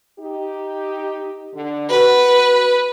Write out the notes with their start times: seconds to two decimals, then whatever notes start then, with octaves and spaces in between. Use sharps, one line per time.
0.20 D#4 G4
1.55 D3
1.90 F#4 B4